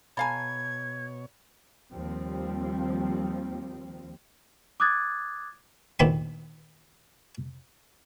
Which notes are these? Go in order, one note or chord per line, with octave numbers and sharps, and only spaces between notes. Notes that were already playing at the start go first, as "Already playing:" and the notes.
B2 A4 C#5 F5 G#5 A#5 B5 G#6
D#2 F3 G3 C4
D6 D#6 F#6 G#6 A6
D2 A#2 D#3 C4 B5 C6